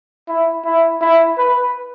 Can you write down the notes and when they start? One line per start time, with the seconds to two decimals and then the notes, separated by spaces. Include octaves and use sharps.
0.28 E4
0.65 E4
1.01 E4
1.38 B4